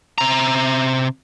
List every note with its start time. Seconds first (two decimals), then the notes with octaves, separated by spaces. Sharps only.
0.18 C3 A#5